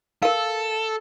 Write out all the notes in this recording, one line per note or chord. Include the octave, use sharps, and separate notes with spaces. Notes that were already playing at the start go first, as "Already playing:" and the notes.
A4 A#4 F5